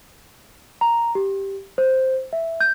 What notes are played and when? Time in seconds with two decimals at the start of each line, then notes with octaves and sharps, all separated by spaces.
0.81 A#5
1.15 G4
1.78 C5
2.33 E5
2.60 G6